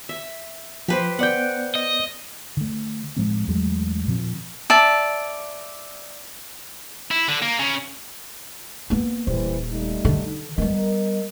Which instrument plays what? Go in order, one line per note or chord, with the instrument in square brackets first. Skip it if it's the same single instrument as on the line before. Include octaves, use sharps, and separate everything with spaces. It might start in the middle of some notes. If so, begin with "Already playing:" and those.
[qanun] E5
[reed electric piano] F3 [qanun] G4 B4 C5
[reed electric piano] B3 D5 G6 [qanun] F#5 G5
[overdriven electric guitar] D#5
[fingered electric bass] D3 A3
A2 F3 G#3 C4
E2 F#3 G#3 A3
A#2 D3 F3 C4
[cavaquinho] D5 E5 A5
[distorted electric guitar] E4
D3
A#3
C#3
[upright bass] A#3 B3
[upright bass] D#1 [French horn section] E3 G3 C5
[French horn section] G3 A3 D#4
[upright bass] D3
[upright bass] G3 B3 [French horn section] A#4 D#5